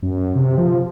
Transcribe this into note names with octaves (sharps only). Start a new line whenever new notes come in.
F#2
C3
F3